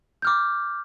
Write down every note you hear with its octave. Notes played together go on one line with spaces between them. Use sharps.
D6 F6 G6